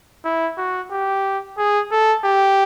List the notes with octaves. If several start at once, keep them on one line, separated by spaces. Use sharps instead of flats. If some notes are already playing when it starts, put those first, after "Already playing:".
E4
F#4
G4
G#4
A4
G4